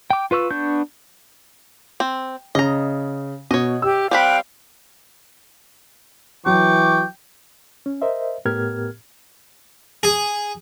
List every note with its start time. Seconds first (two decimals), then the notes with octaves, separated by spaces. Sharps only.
0.10 G5 D6
0.31 F4 B4 C#6 E6
0.51 B3 D4 C#6 G6
2.00 C4
2.55 C#3 D#5 A#5
3.51 B2 C#5 D#5
3.82 G4 E6
4.11 G3 C4 F5 G5 B5 F#6
6.46 E3 F#3 G5 C#6 D6
7.86 C#4
8.02 A#4 C5 D#5 E5
8.45 A2 B3 G4 A#4 F6 G#6
10.03 G#4